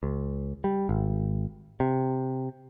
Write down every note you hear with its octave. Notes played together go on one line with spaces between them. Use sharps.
C#2
G3
G#1
C3